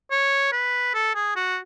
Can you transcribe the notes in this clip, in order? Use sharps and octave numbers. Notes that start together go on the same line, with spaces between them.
C#5
B4
A4
G#4
F#4